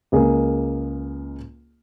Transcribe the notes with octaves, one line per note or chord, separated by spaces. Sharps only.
C#2 A#3 G#4 A#4